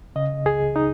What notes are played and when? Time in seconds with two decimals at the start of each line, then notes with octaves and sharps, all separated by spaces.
0.16 C#3 D#5
0.45 C#2 G#4
0.76 D#4